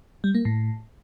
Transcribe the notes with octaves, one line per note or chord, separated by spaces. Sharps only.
G3
A#3
A2